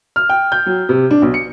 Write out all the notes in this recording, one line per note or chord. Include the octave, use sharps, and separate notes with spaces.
F6
G5
G6
F#3
C3
D4
B1
C#7